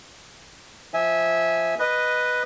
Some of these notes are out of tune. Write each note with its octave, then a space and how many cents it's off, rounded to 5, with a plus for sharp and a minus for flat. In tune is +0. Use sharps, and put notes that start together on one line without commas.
F3 +0 E5 -15 G#5 +0
B4 +0 D#5 -5